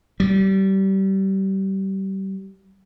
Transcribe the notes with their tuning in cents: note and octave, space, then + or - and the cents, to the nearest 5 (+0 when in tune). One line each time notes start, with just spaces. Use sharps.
G3 -25